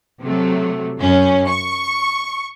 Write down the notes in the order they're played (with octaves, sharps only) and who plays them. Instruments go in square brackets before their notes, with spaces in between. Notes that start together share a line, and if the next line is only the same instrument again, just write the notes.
[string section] C3 F#3 A3
F#2 C#4
C#6